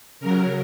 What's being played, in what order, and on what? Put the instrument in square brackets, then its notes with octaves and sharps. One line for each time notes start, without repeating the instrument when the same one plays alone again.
[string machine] C#3 F#3 A#4